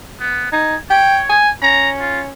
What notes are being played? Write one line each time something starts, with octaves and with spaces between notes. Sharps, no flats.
B3
D#4 G#5
C#5 G5
G#5
C#4 A#5
F4